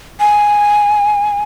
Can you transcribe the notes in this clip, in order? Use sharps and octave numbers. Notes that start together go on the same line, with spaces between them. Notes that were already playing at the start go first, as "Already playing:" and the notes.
G#5